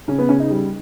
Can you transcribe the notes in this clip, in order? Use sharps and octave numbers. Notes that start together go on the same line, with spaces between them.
C#3 C#4
B3
C#3 C#4
D#4
G3